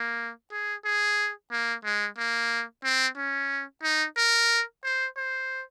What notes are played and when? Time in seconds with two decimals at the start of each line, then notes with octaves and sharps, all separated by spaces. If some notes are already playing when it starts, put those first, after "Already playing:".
Already playing: A#3
0.52 G#4
0.85 G#4
1.51 A#3
1.84 G#3
2.18 A#3
2.84 C4
3.17 C#4
3.83 D#4
4.17 A#4
4.84 C5
5.17 C5